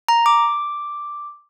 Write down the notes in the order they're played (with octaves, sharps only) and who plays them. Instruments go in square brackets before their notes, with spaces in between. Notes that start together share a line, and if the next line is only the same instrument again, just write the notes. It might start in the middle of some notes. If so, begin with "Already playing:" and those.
[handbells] A#5
D6